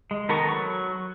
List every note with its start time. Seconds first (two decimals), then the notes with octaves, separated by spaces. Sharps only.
0.11 G#3
0.29 D#3 B3 A4 A#4 C#6
0.49 F#3 C#6